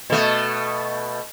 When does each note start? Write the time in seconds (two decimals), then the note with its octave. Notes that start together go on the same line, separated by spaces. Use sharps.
0.10 B2 A3